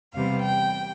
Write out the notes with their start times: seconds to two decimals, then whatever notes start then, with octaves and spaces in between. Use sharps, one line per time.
0.14 E2 C3 G3 B3 F5
0.44 G5